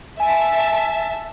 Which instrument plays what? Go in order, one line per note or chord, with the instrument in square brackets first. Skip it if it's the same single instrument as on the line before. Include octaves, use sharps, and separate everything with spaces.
[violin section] E5 A5 [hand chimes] G#5